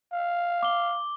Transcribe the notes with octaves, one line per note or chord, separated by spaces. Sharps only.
F5
D6 G7